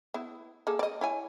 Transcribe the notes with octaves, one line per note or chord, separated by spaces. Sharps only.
B3 E4
A#3 G#4 A4
D5 D#5
E4 C#5 G#5